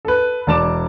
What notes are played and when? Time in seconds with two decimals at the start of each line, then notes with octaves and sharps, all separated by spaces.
0.05 A4 B4
0.47 E1 D5 A5 D6 E7